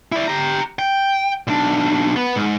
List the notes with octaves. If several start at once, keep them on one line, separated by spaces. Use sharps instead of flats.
E4 D5
G4 A#5
G5
B1 D4
B3
G#2